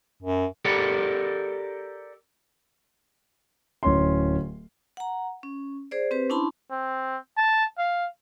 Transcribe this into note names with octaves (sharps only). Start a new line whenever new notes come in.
F#2
G4 A4 A#4 D5 F#5
D1 C#4 C6
F#5 A#5
C#4
G#4 C5 D5
C4 G4 B4 C5
C#4 D4 E4 A5 B5 C6
C4
A5
F5